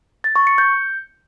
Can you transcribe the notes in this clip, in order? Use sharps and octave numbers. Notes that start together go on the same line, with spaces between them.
A6
C#6
C#7
G6